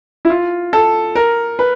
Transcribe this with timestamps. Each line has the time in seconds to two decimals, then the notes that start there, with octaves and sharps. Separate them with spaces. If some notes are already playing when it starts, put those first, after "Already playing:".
0.25 E4
0.30 F4
0.73 A4
1.15 A#4
1.59 B4